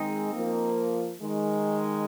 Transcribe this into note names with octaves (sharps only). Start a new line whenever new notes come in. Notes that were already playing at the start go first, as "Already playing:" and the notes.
Already playing: D#3 G#3 C4 D#4 D#5
F3 A#3
D#3 G#3